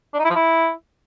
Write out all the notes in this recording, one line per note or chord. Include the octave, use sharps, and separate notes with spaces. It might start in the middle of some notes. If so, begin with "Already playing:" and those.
D4
D#4
E4
F3
E4